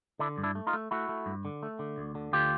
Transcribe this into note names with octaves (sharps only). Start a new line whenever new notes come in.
D3 D4 E4
G2
D4 E4
A3
D#4 F4
A3
A3 E4 F#4
A3
G2
D3
A3
D3
D2
D3
D2 F4 G4